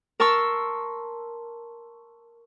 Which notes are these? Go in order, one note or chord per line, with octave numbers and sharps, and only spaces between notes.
A#4 A5 C6 C#6 E6